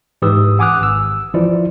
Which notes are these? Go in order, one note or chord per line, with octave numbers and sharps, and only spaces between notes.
G#2 E3 G4 B4 D#6 E6
F#5 G#5 D6 D#6 F6 F#6
G#1 E6
E3 F3 E4 F4 D5